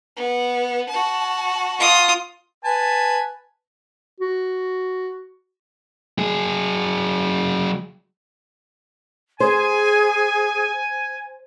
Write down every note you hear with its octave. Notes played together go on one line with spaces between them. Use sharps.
B3
F#4 A5
F4 D#6
B4 G#5 A5
F#4
F#3 G#4
G#4 C5 G#5